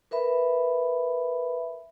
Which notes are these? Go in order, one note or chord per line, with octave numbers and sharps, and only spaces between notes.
A#4 B4 E5 B5